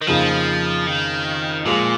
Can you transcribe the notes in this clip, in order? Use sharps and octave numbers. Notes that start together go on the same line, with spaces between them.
D#3
F2 C#3 F3 A#3 D#4 G#4
D#3
A#2 F3 G#3 F4 G#4